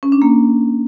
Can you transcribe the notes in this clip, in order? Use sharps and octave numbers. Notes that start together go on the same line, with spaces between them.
C#4
D4
A#3